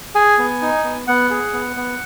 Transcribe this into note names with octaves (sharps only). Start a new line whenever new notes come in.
G#4 G#5
B3
D#4
B3
B3 F#5
G#4
B3
B3